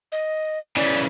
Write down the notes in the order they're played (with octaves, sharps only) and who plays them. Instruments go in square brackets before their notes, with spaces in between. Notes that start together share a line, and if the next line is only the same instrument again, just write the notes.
[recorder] D#5
[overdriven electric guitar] C#3 E3 [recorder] D5